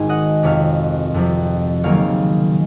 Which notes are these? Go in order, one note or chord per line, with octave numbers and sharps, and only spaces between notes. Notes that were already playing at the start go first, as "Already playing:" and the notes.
Already playing: G#1 G#2 D#3 G#5
D#5 F#5
F2 C3 F3 C#5 F5
F2 C3 F3
C#2 C3 D#3 F#3 A#3 C#5 F5